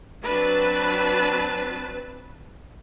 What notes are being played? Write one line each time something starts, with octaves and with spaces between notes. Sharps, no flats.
F#3 C4 D4 B4 A5